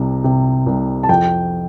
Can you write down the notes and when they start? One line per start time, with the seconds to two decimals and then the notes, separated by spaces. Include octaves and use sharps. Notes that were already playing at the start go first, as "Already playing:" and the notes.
Already playing: C2 C3
0.24 C3
0.66 C2
1.03 A5
1.09 F2 G5